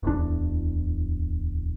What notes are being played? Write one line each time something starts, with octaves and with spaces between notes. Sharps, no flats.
D1 E2 D4